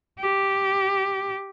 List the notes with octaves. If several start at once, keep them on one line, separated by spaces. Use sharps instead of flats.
G4